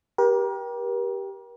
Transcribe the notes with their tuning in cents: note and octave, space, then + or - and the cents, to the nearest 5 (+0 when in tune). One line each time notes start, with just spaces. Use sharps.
G4 +0 A#4 +40